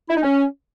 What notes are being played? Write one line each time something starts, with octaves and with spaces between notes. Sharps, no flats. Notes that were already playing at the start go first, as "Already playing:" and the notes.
E4
D#4
C#4